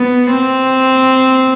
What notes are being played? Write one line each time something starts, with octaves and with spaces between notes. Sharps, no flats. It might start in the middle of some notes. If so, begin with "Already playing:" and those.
Already playing: B3
C4